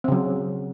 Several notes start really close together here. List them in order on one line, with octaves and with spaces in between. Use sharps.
C4 C#3 F#3